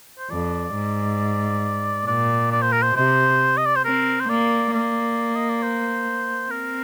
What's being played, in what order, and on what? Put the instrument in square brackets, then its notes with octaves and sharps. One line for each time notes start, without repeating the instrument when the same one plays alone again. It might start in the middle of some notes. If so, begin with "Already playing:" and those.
[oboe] C5
[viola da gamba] F2 [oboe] D5
[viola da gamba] G#2
[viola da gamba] A#2 [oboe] D5
[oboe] D5
C5
A#4
C5
[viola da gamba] C3 [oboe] C5
[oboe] D#5
D5
C5
[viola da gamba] C4 [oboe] A#4
[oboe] C5
[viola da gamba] A#3 [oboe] D5
[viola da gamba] A#3 [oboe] D5
[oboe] D#5
D5
C5
[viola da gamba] C4 [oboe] A#4